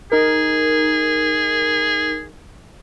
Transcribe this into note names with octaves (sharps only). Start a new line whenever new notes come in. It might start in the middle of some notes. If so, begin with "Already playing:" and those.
D#4 G#4 A#4